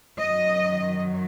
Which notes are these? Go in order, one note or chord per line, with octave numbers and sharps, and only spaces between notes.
F#2 D#3 F#3 D#5